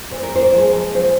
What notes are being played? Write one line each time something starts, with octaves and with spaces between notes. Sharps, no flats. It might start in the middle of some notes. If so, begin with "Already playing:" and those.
A#2 C5
A#4
C5
F3 G#3
A#2 C5